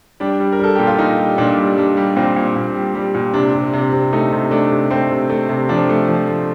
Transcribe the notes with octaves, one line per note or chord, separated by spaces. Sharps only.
G3 D4
G3
A#4
G3 A4
A#2 G4
F4
A#2 D#4
G3
A#2 D4
G3
G3 D4
G3
A#2 C4
A#2
A#2
G3
G3
A#2
C3 D4
C3
C3
C3
A3 D#4
C3
A3 D4
C3
A3 C4
C3
A3
C3
F3 D4
A3
F3
A3